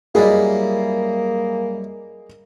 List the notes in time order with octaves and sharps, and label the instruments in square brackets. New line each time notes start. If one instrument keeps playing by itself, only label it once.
[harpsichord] F#2 G3 E4 [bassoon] A#3 [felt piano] G#4 D#5